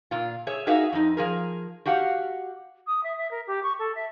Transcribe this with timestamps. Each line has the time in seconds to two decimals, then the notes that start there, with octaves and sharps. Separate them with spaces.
0.11 A#2 F4
0.47 G#4 C#5 E5
0.67 D#4 F#4 G#4 A#4 E5 F5
0.93 F2 D#4
1.17 F3 G#4 A#4
1.86 F#4 G4 F5 F#5
2.87 D#6
3.04 E5
3.18 E5
3.31 A#4
3.47 G4
3.63 C#6
3.79 A4
3.95 E5